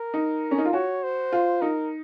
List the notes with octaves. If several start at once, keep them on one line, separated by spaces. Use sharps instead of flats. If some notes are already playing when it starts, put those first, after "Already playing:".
Already playing: A#4
D#4
C#4
D#4
F4
F#4 C#5
C5
F4
D#4 A#4